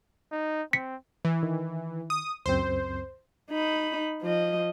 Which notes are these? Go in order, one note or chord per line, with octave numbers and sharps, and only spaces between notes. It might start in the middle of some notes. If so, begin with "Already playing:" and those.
D#4
C4 B6 C#7
E3
D#3
D#6
C#2 F#2 C4 C5
D#4 B5
F3 D#5